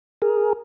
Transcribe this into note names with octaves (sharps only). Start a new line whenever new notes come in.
G#4 A#4